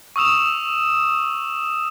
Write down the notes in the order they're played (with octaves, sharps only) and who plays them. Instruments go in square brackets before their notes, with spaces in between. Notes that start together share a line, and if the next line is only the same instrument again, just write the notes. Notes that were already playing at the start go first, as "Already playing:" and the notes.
[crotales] C#6 D#6 E6 E7 F7